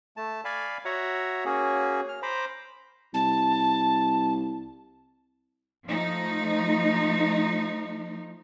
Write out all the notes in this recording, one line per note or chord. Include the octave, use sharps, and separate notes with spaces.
A3 A5
D5 F5 G#5 B5
F#4 C#5 E5 F#5 A#5
A#3 C#4 F#4 G#4
F6
C5 A#5 B5 D6
C2 A5
F3 A3 D#4